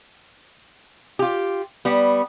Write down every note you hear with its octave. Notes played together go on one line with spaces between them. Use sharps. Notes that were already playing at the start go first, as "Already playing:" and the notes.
F4 G4
G3 B3